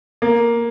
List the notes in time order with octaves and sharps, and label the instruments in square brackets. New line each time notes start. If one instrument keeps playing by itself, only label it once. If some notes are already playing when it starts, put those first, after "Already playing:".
[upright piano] A#3